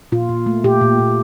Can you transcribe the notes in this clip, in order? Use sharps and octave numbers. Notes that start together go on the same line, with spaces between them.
A#2 F4
A#2
A3
A#2 G4
A#2
A#2